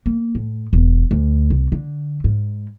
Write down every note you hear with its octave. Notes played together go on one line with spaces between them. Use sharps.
A#3
A2
E1
D2
C2
D3
G#2